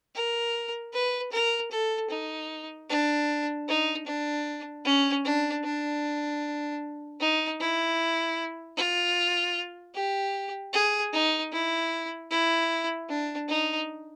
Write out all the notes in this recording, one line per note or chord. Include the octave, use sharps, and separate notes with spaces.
A#4
B4
A#4
A4
D#4
D4
D#4
D4
C#4
D4
D4
D#4
E4
F4
G4
G#4
D#4
E4
E4
D4
D#4